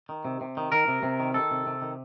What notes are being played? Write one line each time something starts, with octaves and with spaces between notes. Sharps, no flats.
D#3
C3
C3
D#3
D#3 A#4
C3
C3
D#3
D#3 A4
C3
C3
D#3